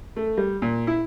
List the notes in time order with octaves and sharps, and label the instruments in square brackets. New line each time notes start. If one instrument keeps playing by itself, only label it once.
[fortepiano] A3
G3
A#2
E4